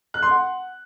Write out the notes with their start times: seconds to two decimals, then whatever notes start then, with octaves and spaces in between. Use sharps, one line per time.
0.14 F#6
0.22 C6
0.31 F#5